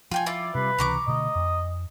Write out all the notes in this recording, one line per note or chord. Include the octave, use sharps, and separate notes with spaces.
F3 F4 G5 G#5
E4 F4 D5
C3 G3 B4
C#2 C3 E3 A#5 C#6 D6
B2 D3 A3 D#5
F2